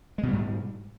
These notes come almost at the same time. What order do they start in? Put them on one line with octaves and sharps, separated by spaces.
G#3 B2 G3 G#2